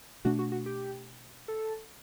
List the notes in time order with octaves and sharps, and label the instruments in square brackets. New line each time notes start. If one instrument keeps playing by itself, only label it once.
[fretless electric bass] B2 A3 D4 [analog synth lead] F#4
[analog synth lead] F#4
F#4
G4
A4